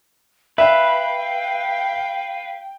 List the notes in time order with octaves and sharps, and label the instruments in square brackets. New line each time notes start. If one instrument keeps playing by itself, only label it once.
[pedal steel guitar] B4 [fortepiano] E5 [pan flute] F5 [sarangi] G5